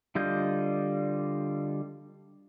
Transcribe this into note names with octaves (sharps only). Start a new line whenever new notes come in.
D3 G3 F4 D#5 G6